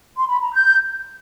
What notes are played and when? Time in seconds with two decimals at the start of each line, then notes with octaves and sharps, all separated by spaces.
0.17 C6
0.29 B5
0.41 A#5
0.53 G6